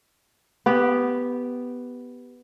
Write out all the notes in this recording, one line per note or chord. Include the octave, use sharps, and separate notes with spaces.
B3 G4